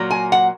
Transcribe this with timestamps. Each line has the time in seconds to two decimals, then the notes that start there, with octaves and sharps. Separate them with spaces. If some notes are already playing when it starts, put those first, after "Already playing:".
Already playing: A#2 F#3 A#3
0.11 G#5
0.32 F#5